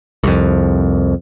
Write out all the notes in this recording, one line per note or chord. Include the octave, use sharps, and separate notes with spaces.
C2 F2